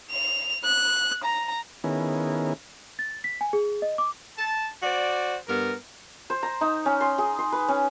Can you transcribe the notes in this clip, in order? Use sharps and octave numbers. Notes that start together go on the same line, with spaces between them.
F7
F#6
A#5
D#3 B3 C#4 E4 G#4 A#4
A6
B6
G#5
G#4
D#5
D6
A5
F#4 C5 D5
G2 B3 A#4
C5
A#5
D#4
C#4
C6
G#4
C6
B4
C#4